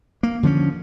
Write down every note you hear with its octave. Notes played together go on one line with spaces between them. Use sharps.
A#3
D3 F3 G#3 C#4